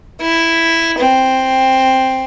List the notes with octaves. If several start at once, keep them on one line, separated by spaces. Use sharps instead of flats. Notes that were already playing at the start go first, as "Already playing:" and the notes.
E4
C4